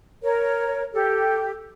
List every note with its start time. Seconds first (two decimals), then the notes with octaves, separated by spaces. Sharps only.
0.23 A#4 C#5
0.94 G4 A4